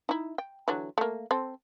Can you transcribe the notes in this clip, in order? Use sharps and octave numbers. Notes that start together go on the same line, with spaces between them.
D#4 E4
G5
D3 E3 F#3
A3 A#3
C4 A4